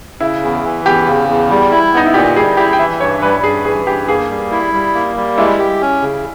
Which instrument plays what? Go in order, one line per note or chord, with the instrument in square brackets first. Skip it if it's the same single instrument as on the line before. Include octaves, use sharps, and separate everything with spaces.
[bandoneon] C#3 [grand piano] E4
[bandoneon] E2
E3
[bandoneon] E2 [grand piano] G4
[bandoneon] C#3
E2
G3
E4
[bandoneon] B3 [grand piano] D#4
[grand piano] E4
[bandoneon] A#2 [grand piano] G4
[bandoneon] G3 [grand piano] G#4
[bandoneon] E4 [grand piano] G4
[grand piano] G5
[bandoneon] E3 [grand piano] E5
[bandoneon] G2 [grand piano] C#5
[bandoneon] G3 [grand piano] B4
[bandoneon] G2 [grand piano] G#4
[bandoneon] E3 [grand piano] G#4
[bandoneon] G2 [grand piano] G4
[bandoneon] A#3 [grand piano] G#4
[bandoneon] G3
E4
G3
A#3
G3
[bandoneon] G#3 [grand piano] E4
[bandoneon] G4
C#4
C#3